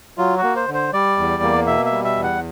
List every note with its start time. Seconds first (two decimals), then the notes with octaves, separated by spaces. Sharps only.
0.18 F#3 F4
0.37 F#4
0.43 A#3
0.56 C5
0.68 D3
0.74 C5
0.93 G3 D5
1.18 E2
1.43 A#3
1.67 B2 E5
1.86 E5
1.92 G3
2.04 E5
2.17 E2
2.23 F#5